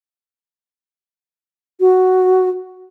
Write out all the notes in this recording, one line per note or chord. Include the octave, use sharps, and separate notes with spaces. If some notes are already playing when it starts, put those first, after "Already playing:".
F#4